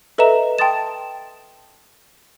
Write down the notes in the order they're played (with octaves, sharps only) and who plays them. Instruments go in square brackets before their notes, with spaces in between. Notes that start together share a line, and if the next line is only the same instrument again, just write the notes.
[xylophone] A4 B4 D#5 E5 A#5 E7
G5 A5 C6 D#6 A6 E7